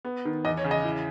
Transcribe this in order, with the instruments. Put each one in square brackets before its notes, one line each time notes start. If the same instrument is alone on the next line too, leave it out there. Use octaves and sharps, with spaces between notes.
[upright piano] B3
D#3
E2 D#5
C#5
C#3
D#5
E4